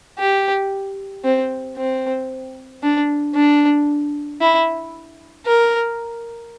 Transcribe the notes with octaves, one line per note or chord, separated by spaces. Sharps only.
G4
C4
C4
D4
D4
E4
A#4